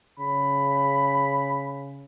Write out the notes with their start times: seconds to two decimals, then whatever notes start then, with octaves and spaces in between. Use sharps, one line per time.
0.19 C#3 B5